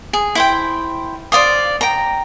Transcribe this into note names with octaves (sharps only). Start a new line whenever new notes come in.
G#4
E4 C5 G5
C5 D5 F5 D#6
G5 A#5